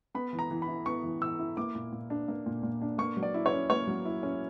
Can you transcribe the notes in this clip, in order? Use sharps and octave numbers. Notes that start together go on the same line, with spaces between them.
B3 B5
E3
A#5
E3
B5
E4
B3 C#6
E3
E3 E6
E4
A#3 D6
A#2
A#2
D4
A#3
A#2
A#2
D4
A#3 C#6
F#3
D5
E4
C#5
C#4
A#3 C#5
F#3
E4
C#4